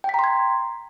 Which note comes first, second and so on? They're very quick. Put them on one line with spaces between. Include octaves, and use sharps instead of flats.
G5 B6 A#5 C6 G#6